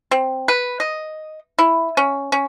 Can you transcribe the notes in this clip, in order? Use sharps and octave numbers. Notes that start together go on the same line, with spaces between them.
C4
B4
D#5
E4
C#4
C#4